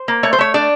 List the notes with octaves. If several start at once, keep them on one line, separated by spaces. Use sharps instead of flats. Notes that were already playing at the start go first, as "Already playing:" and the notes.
Already playing: C5
A#3
A3 C#5
C5
A3 C#5
D4 D5